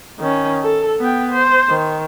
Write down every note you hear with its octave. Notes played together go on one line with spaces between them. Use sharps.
D#3 C#4
A4
B3 G5
C5
D#3